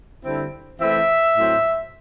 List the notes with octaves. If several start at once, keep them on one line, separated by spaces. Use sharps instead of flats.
D3 G3 C4 E4
E3 A3 C4 E4 E5
A2 F#3 C4